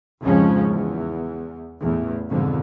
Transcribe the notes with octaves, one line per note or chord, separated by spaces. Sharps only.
F2 G#2 C#3 F3 G#3 C#4
E2
A1 E2
G#1 F2 B2 D3 G#3